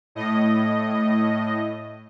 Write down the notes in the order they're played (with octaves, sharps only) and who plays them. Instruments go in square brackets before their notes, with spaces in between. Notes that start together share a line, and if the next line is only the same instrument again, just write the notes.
[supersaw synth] A2 D#5